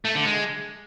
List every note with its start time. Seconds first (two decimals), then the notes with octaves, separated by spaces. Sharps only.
0.05 A3
0.15 D3
0.25 G#3